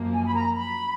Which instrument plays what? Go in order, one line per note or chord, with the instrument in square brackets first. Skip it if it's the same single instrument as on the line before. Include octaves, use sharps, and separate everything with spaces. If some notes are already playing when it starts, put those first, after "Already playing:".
Already playing: [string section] F#2 F3 A#3
[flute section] G#5
B5
A#5
B5